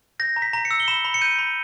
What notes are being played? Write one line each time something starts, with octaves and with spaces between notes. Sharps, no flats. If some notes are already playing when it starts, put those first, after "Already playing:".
G6 A#6
A#5
B6
A#5
C#7
E6
G7
B5 E7
B5
C#7
G6 D#7
B5